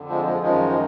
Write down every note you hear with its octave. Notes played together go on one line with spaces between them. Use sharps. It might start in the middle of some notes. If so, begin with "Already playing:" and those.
Already playing: F2 D3
F3 G#3
F3 G#3
F#2 D#3 F3 G#3
F3